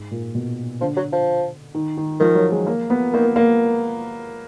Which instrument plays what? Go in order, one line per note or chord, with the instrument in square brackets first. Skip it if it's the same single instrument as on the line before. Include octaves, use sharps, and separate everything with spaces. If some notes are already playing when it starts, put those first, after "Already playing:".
Already playing: [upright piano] G#2
A#2
B2
[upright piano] D3 [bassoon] F3
[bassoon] F#3
F3
[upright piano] D#3
D#3
[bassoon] D#3 [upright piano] F3
[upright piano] F#3
G#3
A#3
B3
[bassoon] D#3 [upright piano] A#3
[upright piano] A#3